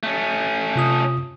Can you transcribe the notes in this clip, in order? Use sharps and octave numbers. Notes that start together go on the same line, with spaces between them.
A3 C#4
C3 F4 D#6